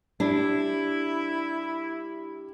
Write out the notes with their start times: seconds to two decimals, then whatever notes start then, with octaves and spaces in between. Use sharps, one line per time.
0.20 G3 D4 E4